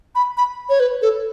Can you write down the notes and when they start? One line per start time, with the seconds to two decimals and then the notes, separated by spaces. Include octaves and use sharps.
0.15 B5
0.37 B5
0.69 C#5
0.80 B4
1.02 A4